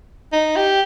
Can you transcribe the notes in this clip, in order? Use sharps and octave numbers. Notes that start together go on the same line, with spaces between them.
D#4
G4